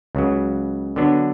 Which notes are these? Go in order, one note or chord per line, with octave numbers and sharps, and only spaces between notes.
C#2 C#3 F#3
D3 F#3 B3 D4